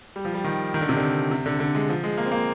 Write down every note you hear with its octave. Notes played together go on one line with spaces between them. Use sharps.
G3
F3
G3
D#3
D#3
D3
C3
D3
C3
D3
D3
G#3
F3
G#3
A#3
C4
A#3